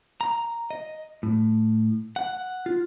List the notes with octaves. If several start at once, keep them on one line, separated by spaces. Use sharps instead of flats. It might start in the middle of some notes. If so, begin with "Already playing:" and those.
A#5
D#5
A2
F#5
F4